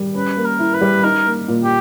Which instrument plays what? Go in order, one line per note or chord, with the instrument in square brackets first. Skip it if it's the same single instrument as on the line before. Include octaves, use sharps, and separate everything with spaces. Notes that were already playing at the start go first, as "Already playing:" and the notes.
Already playing: [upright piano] G3
[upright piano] C#4 [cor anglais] B4
[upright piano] A#3
[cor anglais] A#4
[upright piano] E4
[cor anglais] B4
[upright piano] G3
[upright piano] D#4 [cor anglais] A#4
[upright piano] A#3
A#2
[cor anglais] G4